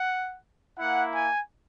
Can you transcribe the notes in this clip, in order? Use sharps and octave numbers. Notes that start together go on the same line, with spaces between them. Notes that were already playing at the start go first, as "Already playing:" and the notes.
Already playing: F#5
A#3 E4 F#5
G#5